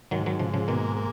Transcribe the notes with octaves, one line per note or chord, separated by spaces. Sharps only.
G#2 D#3 F#3
D#3 F#3
G#2 C#3 F3
C#3 F3
B2 D#3 A#3
A#3